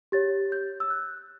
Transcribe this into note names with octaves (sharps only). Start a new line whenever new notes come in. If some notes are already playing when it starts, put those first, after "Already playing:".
G4 C#5 A6
G6
E6
F#6